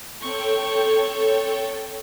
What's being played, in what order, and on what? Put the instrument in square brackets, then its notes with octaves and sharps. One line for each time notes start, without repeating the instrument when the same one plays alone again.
[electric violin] C4 C#6 [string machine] A4 C#5 G5